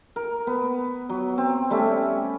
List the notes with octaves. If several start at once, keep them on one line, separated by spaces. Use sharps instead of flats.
A#4
B3
F#3
C4
G3 A3 C#4 E5